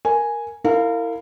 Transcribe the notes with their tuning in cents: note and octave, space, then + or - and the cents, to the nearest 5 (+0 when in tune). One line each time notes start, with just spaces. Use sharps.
A#4 +0 G#5 +0
E4 +0 A#4 -35 F5 +0